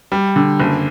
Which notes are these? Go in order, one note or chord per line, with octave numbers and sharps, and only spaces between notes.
G3
D3
F#1